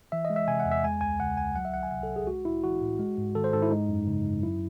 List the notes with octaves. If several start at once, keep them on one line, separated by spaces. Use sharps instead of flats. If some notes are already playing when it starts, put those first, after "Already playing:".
E3 E5
D#5
G#3
E5
C3 G#5
F#5
E2
E5
G#3 G#5
C#2 G#5
C#3 F#5
C#2 G#5
F#3 F#5
E5
C2 F#5
G#5
C3 F#5
A4
C2
G#4
G#3 F#4
A2 E4
E3 F#4
A2
G#3
G#2
D#3 A4
C5
G#2 A4
E4
G#3 D#4
F#2
C#3
F#2
F#3 E4